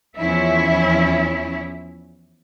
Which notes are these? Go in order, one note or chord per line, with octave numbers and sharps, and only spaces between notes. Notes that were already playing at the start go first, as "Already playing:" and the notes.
E2 F3 C#4 E4 E5